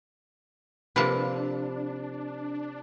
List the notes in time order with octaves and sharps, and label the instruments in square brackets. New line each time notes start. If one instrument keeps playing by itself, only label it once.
[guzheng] C3 F3 A#3 [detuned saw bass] D4 [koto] B4 F5 A5